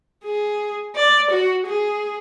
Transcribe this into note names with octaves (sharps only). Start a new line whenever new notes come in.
G#4
D5
F#4
G#4